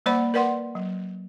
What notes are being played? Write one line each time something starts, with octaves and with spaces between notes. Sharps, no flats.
G3 A#3 C5 D5 F#5 B5
A#4 B4 D5 F#5 C6
F#3